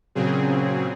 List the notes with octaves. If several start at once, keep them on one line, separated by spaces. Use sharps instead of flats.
A#2 C#3 F#3 C4 G#4